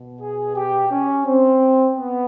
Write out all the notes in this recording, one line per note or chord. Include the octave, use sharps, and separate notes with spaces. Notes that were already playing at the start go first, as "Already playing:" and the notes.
Already playing: B2
G#4
G4
C#4
C4
B3